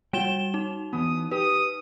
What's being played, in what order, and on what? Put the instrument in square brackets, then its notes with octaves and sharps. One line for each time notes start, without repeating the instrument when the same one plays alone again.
[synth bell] G3 E7 G7 [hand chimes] F#4 [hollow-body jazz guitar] G5
[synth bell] D#4
[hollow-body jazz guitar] E3 B3 [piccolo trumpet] D#6
[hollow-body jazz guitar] G4 [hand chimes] B4 [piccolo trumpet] D#6